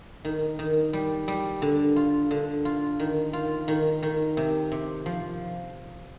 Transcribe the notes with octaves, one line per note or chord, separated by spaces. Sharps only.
D#3
D#3
G3
G3
D3
F4
D3
F4
D#3
F4
D#3
D#3
C3
C3
F3